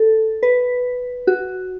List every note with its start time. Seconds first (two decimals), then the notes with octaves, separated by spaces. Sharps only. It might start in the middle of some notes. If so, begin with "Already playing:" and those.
Already playing: A4
0.43 B4
1.27 F#4